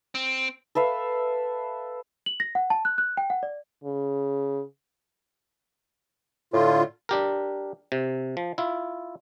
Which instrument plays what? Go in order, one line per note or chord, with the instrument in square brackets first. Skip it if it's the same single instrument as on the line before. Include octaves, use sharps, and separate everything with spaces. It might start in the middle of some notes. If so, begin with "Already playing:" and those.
[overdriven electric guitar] C4
[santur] A4 B4 E5 F5
[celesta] F#7
A#6
F#5
A5
F#6
F#6
G5
F#5
D5
[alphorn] C#3
[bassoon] A2 [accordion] D3 F4
[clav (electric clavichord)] D4 G4 A#4
C3
F3
E4 F4